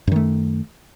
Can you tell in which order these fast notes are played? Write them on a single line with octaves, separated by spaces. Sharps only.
F#2 D#3 A3